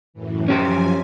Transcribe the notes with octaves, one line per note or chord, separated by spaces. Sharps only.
F#2 A2 E3
F#2 F3 C#4 G4 C5 G#5